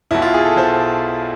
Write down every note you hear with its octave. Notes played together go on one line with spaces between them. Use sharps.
B1 B2 E4
F4
G#4
A4
B2 C5